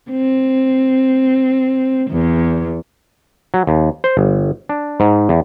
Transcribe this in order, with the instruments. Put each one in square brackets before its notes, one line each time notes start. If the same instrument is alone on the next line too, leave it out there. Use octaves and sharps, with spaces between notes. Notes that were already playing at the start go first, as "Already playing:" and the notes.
[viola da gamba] C4
E2
[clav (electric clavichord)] F#3
D#2
C5
G1
D4
G#2
E2